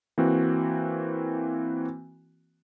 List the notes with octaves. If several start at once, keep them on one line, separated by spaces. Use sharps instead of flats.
E3 A#3 C4 F#4